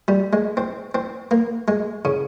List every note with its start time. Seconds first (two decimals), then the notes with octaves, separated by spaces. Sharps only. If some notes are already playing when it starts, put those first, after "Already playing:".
0.08 G3
0.33 G#3
0.57 C4
0.95 C4
1.31 A#3
1.68 G#3
2.05 C#3